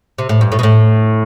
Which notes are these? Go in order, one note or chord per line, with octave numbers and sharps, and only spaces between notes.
C3
A2
G2
A2
B2
A2